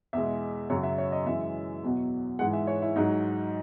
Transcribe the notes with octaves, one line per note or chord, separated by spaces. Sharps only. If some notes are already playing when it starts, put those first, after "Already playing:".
E2 B2 G#3 E5
F#2 C#3 F#3 C#5
E5
C#5
D#5
F#2 E3 G#3 E5
E2 B2 F#3
G#2 E3 G#3 F#5
E5
C#5
E4
G#2 F#3 D#4